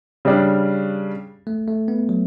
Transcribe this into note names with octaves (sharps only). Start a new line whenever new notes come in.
C#3 G3 D4
A3
A3
B3
F#3